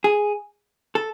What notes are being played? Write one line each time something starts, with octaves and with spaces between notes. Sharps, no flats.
G#4
A4